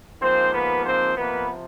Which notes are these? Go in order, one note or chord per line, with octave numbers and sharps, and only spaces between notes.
G#2 F3 A#3 C4 C5
B3 B4
C4 C5
C3 F3 A#3 B3 B4